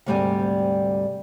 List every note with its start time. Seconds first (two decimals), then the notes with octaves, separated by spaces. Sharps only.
0.06 D2 G#2 C3 G3 D5 G#5